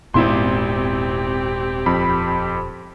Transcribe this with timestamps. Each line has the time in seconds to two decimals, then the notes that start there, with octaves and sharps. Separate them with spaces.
0.14 D#1 G#1 A#2 B3 C4 E4 G4 C6
1.86 F2 B5